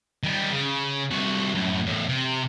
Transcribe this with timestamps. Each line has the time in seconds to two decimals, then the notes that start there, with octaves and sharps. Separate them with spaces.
0.24 D#3 G3
0.52 C#3
1.10 C2 F#4
1.54 F#2 A2
1.86 E2 A2
2.08 C3